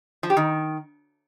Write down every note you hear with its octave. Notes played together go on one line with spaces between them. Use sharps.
F3
G4
D#3